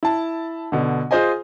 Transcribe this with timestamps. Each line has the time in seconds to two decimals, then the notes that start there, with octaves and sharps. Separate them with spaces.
0.03 E4 A5
0.72 B2 D3
1.11 F4 G#4 C5 D#5 G#5